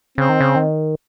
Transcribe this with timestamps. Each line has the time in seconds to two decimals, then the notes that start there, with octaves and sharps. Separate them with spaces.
0.18 C#3 C4
0.29 D#3
0.40 C#3
0.56 D#3